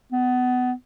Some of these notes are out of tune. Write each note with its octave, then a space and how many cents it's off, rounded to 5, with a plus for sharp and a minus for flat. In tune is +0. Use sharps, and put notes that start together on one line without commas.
B3 +20